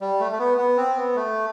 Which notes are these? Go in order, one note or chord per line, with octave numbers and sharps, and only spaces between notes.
G3
A3
A3
B3
B3
C4
B3
A3